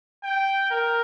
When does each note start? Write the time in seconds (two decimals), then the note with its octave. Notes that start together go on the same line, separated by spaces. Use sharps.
0.24 G5
0.71 A#4